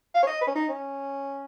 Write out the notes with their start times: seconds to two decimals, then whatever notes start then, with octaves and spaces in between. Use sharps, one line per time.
0.14 F5
0.23 C#5
0.27 D#5
0.41 B4
0.47 C#4
0.55 D#4
0.68 C#4